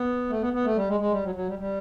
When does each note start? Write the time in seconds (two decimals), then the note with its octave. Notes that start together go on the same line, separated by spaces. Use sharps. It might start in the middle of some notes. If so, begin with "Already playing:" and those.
Already playing: B3
0.30 A3
0.42 B3
0.53 B3
0.65 A3
0.76 G3
0.88 G#3
1.00 G#3
1.12 G3
1.24 F#3
1.35 F#3
1.47 G3
1.59 G3